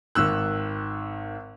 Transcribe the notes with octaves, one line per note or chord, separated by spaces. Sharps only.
G#1 D#3 E6 F#6